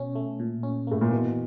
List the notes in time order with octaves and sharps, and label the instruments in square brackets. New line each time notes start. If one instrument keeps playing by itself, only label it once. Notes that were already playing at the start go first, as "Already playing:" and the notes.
Already playing: [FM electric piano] B2 C#4
A3
A#2
C#4
[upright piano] A2 [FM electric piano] A#3
[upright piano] A#2
[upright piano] B2 [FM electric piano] E3